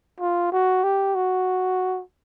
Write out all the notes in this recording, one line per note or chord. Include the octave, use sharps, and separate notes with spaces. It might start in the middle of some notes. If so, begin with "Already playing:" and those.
F4
F#4
G4
F#4